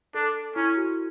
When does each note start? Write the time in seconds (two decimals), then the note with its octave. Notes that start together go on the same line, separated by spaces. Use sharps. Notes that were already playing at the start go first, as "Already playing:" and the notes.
0.14 D4 A4
0.56 C#4 E4
0.76 F#4